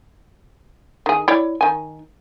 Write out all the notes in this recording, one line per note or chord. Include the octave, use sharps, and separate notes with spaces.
D#3 G#4
E4 C#5 D5
D#3 G#5